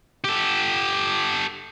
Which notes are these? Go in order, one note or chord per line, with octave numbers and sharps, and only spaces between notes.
G4 A4